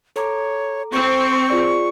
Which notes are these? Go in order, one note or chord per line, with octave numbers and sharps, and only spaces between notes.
A4 C#5 A#5 D6
C4 C#6
F4 G#4 D5